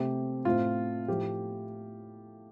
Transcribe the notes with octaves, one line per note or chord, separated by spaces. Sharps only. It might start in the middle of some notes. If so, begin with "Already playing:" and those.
Already playing: C3 A3 C4 G4
A2 A3 C4 F4
A2 F3 A3 G4